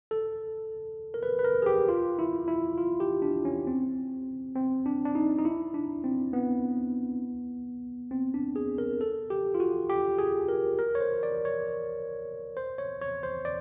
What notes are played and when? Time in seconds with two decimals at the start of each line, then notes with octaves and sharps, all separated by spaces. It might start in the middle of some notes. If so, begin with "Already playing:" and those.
0.11 A4
1.14 A#4
1.23 B4
1.39 B4
1.44 A#4
1.62 G#4
1.66 G4
1.88 F4
2.19 E4
2.48 E4
2.78 F4
3.00 G4
3.22 D4
3.45 C#4
3.67 C4
4.56 C4
4.86 D4
5.05 D4
5.15 D#4
5.39 D#4
5.45 E4
5.74 D4
6.04 C4
6.33 B3
8.11 C4
8.34 D4
8.56 G#4
8.78 A#4
9.01 A4
9.30 G4
9.54 F4
9.60 F#4
9.90 G4
10.19 G#4
10.48 A#4
10.79 A#4
10.95 C#5
11.01 C5
11.23 D5
11.45 C#5
12.57 C5
12.78 C#5
13.01 C#5
13.23 C5
13.45 D5